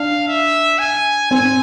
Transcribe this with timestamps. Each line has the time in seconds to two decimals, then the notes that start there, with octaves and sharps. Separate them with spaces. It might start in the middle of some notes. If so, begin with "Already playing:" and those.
Already playing: D4 F5
0.28 E5
0.79 G#5
1.31 C4 G#5